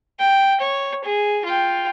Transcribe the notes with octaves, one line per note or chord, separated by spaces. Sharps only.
G5
C#5
G#4
F4 G5